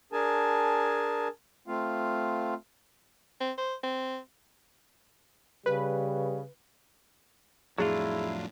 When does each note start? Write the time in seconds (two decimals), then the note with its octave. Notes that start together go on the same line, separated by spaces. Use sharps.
0.13 D4 G#4 A#4 G#5 A5
1.68 A3 C4 F4 F5
3.40 C4
3.58 C5
3.83 C4
5.66 C#3 G3 B4
7.78 F2 A2 F#3 D4 E4 F4 G#4